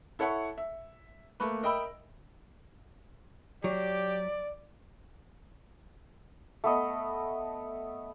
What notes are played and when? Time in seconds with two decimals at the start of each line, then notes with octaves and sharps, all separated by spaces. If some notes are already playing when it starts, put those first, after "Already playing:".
0.19 E4 A4 C#5 E5 F#5 C#6
0.58 E5
1.40 A3 A#3 B4
1.63 A#4 D#5 E5 G5 B5 E6
3.64 F#3 G4 D5
6.64 A3 B3 D#5